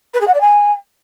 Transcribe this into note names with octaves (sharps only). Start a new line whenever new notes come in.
B4
G#4
F#5
D5
G#5